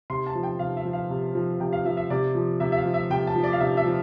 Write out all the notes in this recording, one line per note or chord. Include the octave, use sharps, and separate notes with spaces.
C3 C6
A5
F3
G5
C3 F5
E5
F3
F5
C3
F3
C3 G5
F5
F3 E5
E5
C3 D5
F3
C3 E5
E5
F5
F3
E5
C3 G5
A5
F3
D5
F5
C3 E5
E5
F3